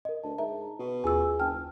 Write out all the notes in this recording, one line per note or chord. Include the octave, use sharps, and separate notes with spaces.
A#4 D#5
D2 A5
G#2 A#4 E5 A#5
B2
D#2 F4 G#4 G#5 E6
F#1 G5 A5 F6